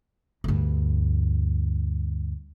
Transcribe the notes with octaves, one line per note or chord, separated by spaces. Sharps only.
D2 G2